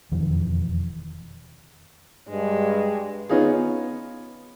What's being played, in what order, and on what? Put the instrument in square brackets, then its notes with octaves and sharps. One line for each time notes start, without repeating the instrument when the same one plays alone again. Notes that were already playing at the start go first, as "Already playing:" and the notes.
[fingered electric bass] E1 F2 D#3 E3
[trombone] G2 [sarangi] G#3
[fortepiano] B3 C#4 D#4 F4 G#4